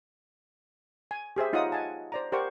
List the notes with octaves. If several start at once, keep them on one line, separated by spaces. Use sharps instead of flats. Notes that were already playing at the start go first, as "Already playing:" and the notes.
G#5
G4 G#4 C5 E5
D#4 F4 C#5 D#5 F#5 D#6
F#5 G#5 A5
C5 D5 A#5
G4 A#4 C5 D5 F#5 C#6